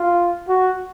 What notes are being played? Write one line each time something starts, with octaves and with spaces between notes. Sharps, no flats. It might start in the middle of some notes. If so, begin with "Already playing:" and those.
Already playing: F4
F#4